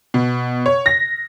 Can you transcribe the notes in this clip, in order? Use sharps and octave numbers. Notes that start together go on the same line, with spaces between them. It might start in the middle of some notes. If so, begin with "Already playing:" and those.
B2
C#5
A#6